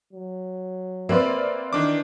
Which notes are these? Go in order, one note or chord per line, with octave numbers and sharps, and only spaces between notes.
F#3
A#3 C4 B4 D5 E5
D#3 E3 D4 D6